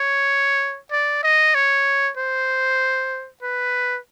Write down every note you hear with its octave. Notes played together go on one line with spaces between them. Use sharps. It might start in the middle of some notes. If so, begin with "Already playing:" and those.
Already playing: C#5
D5
D#5
C#5
C5
B4